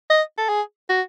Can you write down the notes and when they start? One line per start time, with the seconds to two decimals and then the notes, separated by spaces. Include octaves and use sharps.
0.10 D#5
0.38 A4
0.49 G#4
0.89 F#4